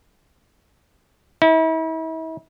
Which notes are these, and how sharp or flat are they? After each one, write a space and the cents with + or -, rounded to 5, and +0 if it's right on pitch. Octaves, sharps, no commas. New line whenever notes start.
E4 -40